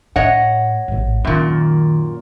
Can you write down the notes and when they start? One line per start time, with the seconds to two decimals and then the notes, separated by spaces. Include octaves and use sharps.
0.16 A2 C#5 D#5 F#5
0.88 A1 G#2
1.25 F#2 A#2 D#3